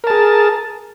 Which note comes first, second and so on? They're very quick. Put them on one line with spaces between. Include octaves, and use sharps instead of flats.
A#4 A5 G#4